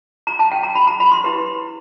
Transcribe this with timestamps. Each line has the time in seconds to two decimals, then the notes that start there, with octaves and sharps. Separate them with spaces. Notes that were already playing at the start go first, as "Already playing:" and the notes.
0.27 A#5
0.39 A5
0.52 G5
0.63 A#5
0.75 B5
0.87 A#5
1.00 B5
1.12 C6
1.24 E4 G4 B4